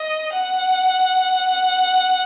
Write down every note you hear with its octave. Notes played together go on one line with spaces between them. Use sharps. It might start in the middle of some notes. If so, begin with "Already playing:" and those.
Already playing: D#5
F#5